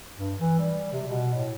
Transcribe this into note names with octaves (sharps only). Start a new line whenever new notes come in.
G2
E3
G3
C3
B2
A2